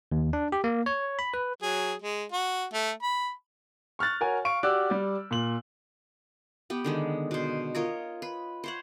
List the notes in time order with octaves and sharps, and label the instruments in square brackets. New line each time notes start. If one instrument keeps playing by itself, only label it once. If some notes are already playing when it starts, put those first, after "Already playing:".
[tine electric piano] D#2
D4
G4
A#3
C#5
B5
B4
[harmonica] F#3 G#4
G#3
F#4
A3
B5
[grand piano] C#6 F6 F#6 A6
F#4 A#4 C#5 G#5
F5 C#6 D7
F#4 G4 D5 D6 E6 F#6
G3 D5
A#2 F#7
[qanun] B3 G4
D3 D#3 G#3
B2 C5
F4 A#4 C#5 D#5
B4
C5 C#5 F#5